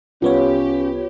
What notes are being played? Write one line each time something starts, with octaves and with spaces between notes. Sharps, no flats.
C2 B3 C#4 F4 G4 B4 C#5